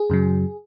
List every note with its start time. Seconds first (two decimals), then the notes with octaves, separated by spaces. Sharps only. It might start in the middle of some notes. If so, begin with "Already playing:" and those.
Already playing: G#4
0.10 F#2 C#3 F#3